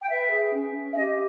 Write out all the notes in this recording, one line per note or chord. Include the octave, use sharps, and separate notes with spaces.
G5
B4 E5
G#4
C#4
C#4
E5
G4 D#5